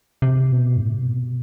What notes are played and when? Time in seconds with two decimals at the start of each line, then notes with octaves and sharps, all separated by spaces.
0.22 C3
0.52 B2
0.77 G2
0.82 A2
0.92 C3
1.02 B2